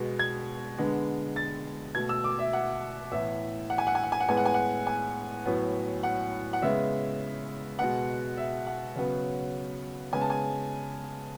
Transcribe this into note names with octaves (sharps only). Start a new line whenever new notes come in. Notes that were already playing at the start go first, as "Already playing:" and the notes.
Already playing: B2 G#3 B3
G#6
D3 G#3 B3
A6
B2 A3 G#6
E6
D6
E5
F#5
A2 E3 B3 E5
F#5
G#5
F#5
G#5
F#5
G#5
F#5
A2 G#3 B3 G#5
F#5
G#5
F#5
G#5
A2 F#3 B3
F#5
F#5
C#3 G#3 B3 E5
B2 G#3 B3 F#5
E5
F#5
C#3 F#3 B3
C#3 G#3 B3 G#5
A5
G#5